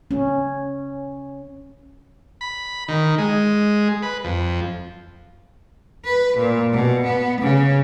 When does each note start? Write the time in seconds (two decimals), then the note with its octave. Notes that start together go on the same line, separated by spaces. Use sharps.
0.11 C#4
2.41 B5
2.88 D#3
3.18 G#3
4.03 B4
4.24 F2
6.05 B4
6.38 A#2
6.73 B2
7.05 B3
7.41 C#3